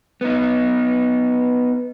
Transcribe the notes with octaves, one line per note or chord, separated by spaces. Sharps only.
B3 D#4